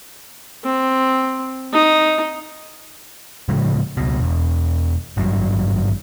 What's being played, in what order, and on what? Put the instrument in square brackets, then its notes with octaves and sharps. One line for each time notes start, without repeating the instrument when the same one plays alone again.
[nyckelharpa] C4
D#4
[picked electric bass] A2 C#3 F3 G#3
C#2 B2
E1 E2
G#1 G2 F#3